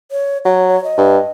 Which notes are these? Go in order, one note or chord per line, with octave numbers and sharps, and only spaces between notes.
C#5
F#3 C#5
C#5
D#5
G2